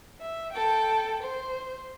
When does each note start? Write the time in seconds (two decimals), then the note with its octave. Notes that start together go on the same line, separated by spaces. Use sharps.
0.20 E5
0.53 A4 G5
1.22 C5